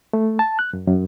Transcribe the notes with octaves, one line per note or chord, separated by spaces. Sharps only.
A3
A5
F#6
F#2
F#2